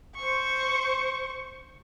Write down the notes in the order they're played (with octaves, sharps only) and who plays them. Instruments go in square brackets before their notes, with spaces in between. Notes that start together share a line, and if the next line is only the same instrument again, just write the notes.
[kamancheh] C5 C#6